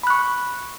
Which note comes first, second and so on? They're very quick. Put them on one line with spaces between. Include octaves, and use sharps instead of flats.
B5 F#6 C#6